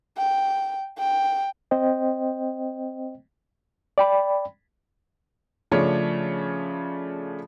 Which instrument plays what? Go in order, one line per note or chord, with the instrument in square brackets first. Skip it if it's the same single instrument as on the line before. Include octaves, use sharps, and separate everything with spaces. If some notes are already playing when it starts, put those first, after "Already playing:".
[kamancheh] G5
G5
[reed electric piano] C4 C5 D#5 G5
D5 G5 B5
[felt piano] C#3 F3 A3 D4 C#5